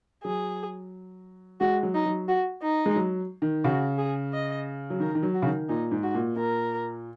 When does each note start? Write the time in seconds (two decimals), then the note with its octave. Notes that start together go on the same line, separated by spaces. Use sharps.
0.24 F#3 G#4
1.60 G#3 F#4
1.83 F#3
1.94 D#4
2.06 F#3
2.28 F#4
2.62 D#4
2.86 G#3
2.96 F#3
3.42 D#3
3.64 C#3 F#4
3.98 G#4
4.33 D#5
4.90 F#3
5.00 D#3 A#4
5.15 D#3
5.23 F#3
5.34 F#4
5.42 C#3
5.46 D#3
5.68 A#2 D#4
5.91 G#2
6.03 F#4
6.15 A#2
6.36 A#2 A#4